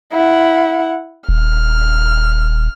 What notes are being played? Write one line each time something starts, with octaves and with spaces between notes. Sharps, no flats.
E4 F#5
D#1 F6